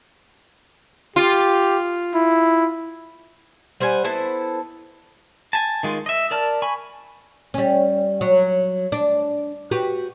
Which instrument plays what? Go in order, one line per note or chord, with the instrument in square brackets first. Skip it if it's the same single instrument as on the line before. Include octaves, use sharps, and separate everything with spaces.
[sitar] F4 [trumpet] G4
[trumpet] E4
[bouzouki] G3 C5 F#5 G#5
B3 E4 A4 C5
[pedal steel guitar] G#5 A5
D#3 G#3 F4
D#5 E5
A#4 D5 A5 F6
G#5 B5 C#6
[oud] G3 C#4
F#3
D4
F#4 G4 B4